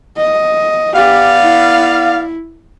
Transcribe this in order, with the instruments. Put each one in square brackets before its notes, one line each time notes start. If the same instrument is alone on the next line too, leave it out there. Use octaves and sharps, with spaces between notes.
[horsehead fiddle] D#5
[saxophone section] B3 D5 F5 [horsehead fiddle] G4
[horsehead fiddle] E4